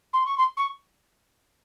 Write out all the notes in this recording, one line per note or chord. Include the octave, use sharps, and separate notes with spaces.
C6
C#6
C6
C#6